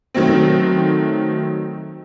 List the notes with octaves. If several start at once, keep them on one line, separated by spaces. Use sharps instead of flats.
D#3 F#3 A3 C4